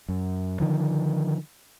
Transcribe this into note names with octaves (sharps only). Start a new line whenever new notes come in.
F#2
D3 D#3 F3